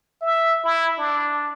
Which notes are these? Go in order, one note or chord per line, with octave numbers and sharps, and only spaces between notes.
E5
E4
D4